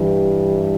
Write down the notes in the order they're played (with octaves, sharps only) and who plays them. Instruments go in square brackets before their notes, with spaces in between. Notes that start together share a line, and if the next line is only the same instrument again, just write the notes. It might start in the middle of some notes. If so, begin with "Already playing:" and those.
Already playing: [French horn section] G2 E3 G3